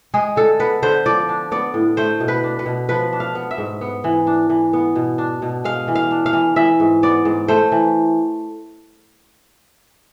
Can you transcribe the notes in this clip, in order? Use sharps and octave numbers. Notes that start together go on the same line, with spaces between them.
G#3 G#4
D3 A4
B3 B4
D3 C5
F3 D5
D4
B3 D5
A2
A3 C5
B2
B4
D4
B4
B2
F3 B4
D4
F5
B3
E5
G#2
B3
E3
D4
E3
B3
B2
D4
B2
G#3 F5
E3
F5
D4
F5
E3
E3 E5
G#2
B3 D5
G#2
A3 C5
E3